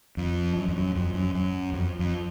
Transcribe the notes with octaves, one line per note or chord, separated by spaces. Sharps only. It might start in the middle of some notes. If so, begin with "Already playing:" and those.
F2
F#2
F2
F#2
F2
F#2
F#2
F2
F2